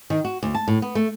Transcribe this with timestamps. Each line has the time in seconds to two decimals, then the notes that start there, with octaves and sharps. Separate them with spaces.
0.10 D#3
0.25 F#4
0.43 D2
0.54 A5
0.68 A2
0.82 B3
0.95 A3